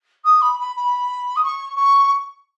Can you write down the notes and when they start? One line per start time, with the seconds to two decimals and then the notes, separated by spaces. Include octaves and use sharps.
0.25 D#6
0.42 B5
0.60 B5
0.76 B5
1.36 D#6
1.44 C#6
1.76 C#6